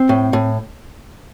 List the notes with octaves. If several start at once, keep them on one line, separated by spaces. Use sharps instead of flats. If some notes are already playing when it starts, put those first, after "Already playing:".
Already playing: C4
A2
A2